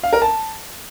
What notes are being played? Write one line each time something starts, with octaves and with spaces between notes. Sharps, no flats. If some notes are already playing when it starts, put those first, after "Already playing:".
F5
A#4
A5